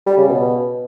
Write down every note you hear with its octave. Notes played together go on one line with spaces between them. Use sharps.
G3
C#3
B2